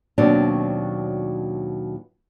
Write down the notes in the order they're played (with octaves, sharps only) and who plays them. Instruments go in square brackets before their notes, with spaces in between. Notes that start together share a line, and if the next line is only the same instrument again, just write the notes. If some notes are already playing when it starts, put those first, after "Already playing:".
[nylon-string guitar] D#2 B2 F#3 C4 D4 C#5